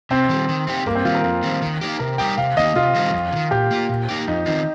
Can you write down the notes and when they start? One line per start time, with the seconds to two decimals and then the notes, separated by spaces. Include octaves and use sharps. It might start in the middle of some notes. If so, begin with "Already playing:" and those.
0.11 C3 C4
0.29 D#3 G3
0.49 D#3
0.67 C4 D#4 G4
0.86 G2 A#3
0.95 C4
1.05 D#3 G3 F4
1.15 A#4
1.24 F2
1.43 D#3 G3 C4
1.62 D#3
1.81 A#3 D#4 G4
1.99 C3 A#4
2.18 G3 D#4 G4 G5
2.38 C3 F5
2.57 D#3 A#3 D#4 D#5
2.75 C3 F4
2.95 D#3 G3 C4
3.14 F2
3.32 C3
3.36 D#3
3.51 A#2 G4
3.71 A#3 F4
3.89 A#2
4.09 A#3 D#4 G4
4.27 F2 D#4
4.46 D#3 C4 D#4 F4